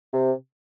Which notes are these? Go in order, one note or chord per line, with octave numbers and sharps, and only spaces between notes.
C3